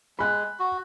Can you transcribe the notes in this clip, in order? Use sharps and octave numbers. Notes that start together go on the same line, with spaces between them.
G#3 B5 F#6
F#4